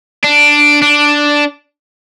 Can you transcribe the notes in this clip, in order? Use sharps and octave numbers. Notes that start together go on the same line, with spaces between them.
D4
D4